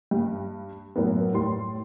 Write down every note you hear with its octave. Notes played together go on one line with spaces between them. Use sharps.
G2
F#2 A2 A#3 B3
A2 G3 C6